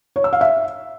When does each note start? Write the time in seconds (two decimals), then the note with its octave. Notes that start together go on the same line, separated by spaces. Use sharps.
0.16 C#5
0.24 E6
0.33 F5
0.41 E5